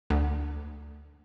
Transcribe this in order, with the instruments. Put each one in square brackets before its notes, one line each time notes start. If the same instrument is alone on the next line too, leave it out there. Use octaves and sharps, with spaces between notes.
[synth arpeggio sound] D2